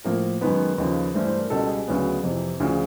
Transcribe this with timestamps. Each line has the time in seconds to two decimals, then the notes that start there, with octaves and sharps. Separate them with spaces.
0.04 A2 F3 A#3 A#4
0.41 F#2 D#3 G#3 B3 B4
0.78 D#2 C#3 F3
1.14 G2 E3 A3 C5
1.27 C5
1.38 A#4
1.50 C#2 B2 G3 A4
1.69 G#4
1.88 D2 C#3 F#3 B3
2.23 F2 C3 E3
2.60 D2 C#3 F3 G#4